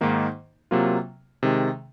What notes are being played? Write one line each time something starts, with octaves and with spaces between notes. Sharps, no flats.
G#2 D#3 A#3 D#4
C3 F#3 A#3 F4
C3 D#3 G#3